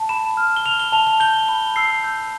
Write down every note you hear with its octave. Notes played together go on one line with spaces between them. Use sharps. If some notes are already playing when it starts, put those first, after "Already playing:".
Already playing: A5
B5 E7
F6
G7
F6 F7
G7
A5 F7
F7
G6 G7
B5 G7
E6 C7
G6